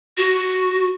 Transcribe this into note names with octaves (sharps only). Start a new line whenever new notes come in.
F#4